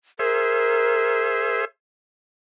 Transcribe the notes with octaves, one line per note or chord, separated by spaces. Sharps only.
G#4 A#4 C5 E5